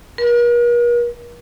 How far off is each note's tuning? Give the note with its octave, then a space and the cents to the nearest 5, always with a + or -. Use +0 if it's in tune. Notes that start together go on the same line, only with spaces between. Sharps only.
A#4 +45